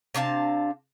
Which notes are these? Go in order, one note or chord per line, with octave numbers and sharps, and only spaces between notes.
C3 D4 F5 A5